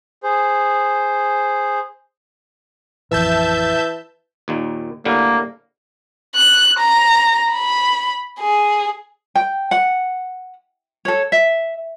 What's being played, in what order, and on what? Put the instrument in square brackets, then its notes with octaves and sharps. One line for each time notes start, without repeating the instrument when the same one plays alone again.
[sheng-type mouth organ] G#4 C5
[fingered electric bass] A1 F2 [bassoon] E3 [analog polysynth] E5 A5 G6
[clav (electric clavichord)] D#2 A#2 D#3
[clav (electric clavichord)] A2 D3 G3 [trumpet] A#3
[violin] F#6
A#5
B5
G#4
[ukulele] G5
F#5
A4 C#5
E5